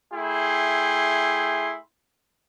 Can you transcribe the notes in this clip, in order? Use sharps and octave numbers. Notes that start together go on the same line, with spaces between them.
A3 E4 G#4 G5 C6